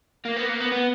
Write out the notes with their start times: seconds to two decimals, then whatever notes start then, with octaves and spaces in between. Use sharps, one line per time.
0.25 A#3
0.36 B3
0.49 A#3
0.60 B3
0.72 B3